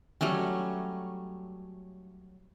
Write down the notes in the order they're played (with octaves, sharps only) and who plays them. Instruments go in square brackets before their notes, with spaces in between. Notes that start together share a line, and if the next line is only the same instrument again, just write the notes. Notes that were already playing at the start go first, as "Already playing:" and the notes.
[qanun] F#3 G3 A3 C#4